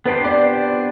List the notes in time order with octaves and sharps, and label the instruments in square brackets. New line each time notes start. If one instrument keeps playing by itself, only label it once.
[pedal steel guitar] B3 D4 G4 C5 [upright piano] B4
[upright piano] D5